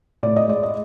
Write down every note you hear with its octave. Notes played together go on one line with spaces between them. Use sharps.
A2 D5
D#5
G#3 D5
D#5